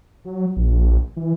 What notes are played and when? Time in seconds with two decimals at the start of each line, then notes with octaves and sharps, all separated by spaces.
0.25 F#3
0.56 A#1
1.17 E3